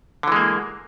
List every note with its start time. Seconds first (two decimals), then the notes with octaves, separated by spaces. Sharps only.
0.23 D3
0.28 E3
0.32 G#3
0.36 A#3